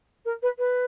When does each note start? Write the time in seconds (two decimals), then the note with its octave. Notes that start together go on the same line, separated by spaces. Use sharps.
0.25 A#4
0.42 B4
0.58 B4